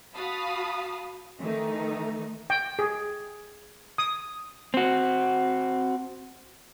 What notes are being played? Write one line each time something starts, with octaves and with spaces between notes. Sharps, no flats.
F#4 F5 A5 B5 D#6
D#3 E3 A3 D#4
G5
G#4
D#6
C4 F#4